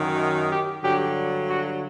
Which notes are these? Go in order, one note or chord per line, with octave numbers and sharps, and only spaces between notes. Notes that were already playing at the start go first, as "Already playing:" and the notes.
Already playing: F#2 D#3 F#3
G4
G2 D3 F#3 G4
F#4